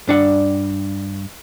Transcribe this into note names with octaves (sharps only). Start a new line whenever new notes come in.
G2 D4 F#5